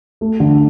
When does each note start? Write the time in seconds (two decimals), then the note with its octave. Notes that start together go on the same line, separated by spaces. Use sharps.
0.21 A3
0.40 D3